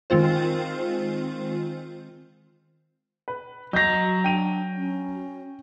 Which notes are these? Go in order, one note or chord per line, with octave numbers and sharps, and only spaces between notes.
D#3 G#3 C4 F4 C5
B4
F#3 F#4 D#5 A#5 G6 A#6
D4 G5 D#7 F7
C#4